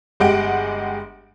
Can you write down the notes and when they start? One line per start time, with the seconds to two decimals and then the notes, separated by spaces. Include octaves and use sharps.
0.20 G1 G#3 G4 F#5 D7